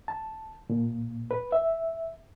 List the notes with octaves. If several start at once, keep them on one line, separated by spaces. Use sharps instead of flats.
A5
A#2
B4
E5